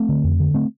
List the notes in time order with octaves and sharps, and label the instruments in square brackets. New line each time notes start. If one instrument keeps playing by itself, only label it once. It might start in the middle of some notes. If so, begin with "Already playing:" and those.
Already playing: [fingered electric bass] A3 C4
D3
F2
D3
A3 C4